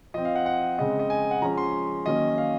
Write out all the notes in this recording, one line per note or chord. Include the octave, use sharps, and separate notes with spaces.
F3 C4 D#5
F5
F#5
F#5
C#3 G#3 C4 D#5
D#5
G#5
F#5
F3 G#3 C#4 A#5
C6
D#3 F#3 A#3 C#4 D#5
F5